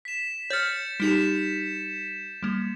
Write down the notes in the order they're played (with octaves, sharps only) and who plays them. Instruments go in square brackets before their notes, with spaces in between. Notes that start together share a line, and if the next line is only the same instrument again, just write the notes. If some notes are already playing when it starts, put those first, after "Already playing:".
[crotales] B6 E7
[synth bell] C#5 F6 [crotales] G6 A6 C#7
[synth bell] G3 D#4 G4 [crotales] B6 E7
[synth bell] G3 A#3